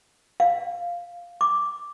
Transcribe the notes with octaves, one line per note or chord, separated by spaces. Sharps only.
F5
D6